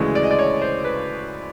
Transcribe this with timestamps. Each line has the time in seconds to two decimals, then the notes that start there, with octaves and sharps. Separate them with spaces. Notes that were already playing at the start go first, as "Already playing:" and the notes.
Already playing: D2 C#3 E3 G#3
0.15 D5
0.23 D#5
0.31 D5
0.39 C#5
0.61 C5
0.84 B4